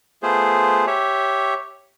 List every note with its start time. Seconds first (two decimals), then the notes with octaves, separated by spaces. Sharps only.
0.23 A3 B3 F4 G#4 C5
0.87 G4 C#5 E5